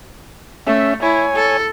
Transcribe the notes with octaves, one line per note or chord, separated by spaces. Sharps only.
A3 C#4 E5
E4 C#5 G#5
A4